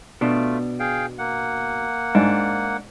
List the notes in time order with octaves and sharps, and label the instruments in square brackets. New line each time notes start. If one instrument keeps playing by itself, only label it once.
[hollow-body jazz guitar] B2 D4 [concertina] A3 F4
[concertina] G#4 F5 G5
A#3 F#5
[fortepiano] G#2 [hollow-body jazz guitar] D4